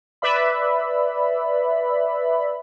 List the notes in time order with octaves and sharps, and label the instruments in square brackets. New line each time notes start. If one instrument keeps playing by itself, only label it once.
[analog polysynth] B4 D5 E5 B5